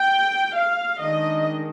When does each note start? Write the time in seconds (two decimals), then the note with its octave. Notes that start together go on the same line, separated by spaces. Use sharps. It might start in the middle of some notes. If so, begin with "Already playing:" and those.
Already playing: G5
0.56 F5
1.01 D#3 G#3 D4 D#5